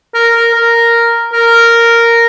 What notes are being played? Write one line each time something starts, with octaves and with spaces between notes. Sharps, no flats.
A#4
A#4
A#4
A#4